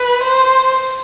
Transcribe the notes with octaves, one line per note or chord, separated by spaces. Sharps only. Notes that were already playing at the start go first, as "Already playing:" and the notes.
Already playing: B4
C5